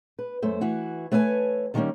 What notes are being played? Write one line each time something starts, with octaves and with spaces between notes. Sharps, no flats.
B4
F#2 A3 C5
E3 E4 F#4
A3 B4 C#5 D#5 G#5
D3 D#3 G3 G#3 A#3 C#4